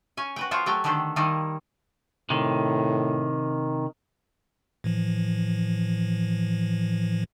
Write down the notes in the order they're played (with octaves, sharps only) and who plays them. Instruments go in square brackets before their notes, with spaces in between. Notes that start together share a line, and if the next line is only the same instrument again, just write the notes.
[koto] C#4 G#5
F#4 B4 G5
F3 F4 C5 C#5 G5
F#3 A3 G4 G5 G#5
D3 D#3 D4 G4 A4 C5
D#3 F3 G3 A#3 D#4 E4
[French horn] A2 [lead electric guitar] C3 D#3
[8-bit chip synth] A2 E3 F3